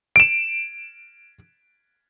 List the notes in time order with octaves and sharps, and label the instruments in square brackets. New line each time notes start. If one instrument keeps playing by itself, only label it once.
[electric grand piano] D7 E7